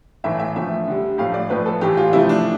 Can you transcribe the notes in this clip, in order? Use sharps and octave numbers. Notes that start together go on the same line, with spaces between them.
A2 E3 A3 E5
E5
D3 F3 A3 E5
D3 G3
A2 F3 A3 F5
D5
A2 F3 A3 B4
A4
A2 E3 A3 G4
F4
C3 F3 A3 E4
D4